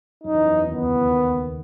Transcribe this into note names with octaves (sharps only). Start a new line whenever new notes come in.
F#2 F#3 D#4
E2 E3
F#2 F#3
E2 E3
D#2 D#3 B3
C#2 C#3
E2 E3
D#2 D#3
C#2 C#3
D#2 D#3